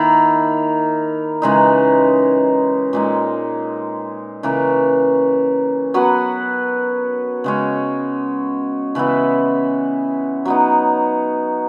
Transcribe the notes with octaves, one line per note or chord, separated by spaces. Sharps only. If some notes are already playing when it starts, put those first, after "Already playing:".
Already playing: D#3 A#3 E4
C#3 E3 G#3 D#4
A#2 G#3 D#4
C#3 E3 A#3 C#4
F#3 B3 F#4 B4
C#3 G#3 C#4
C#3 E3 B3 E4
F#3 B3 D#4